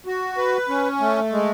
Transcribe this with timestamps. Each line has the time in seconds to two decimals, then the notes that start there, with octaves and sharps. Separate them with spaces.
0.06 F#4
0.37 B4
0.69 C#4
1.00 A3
1.32 G#3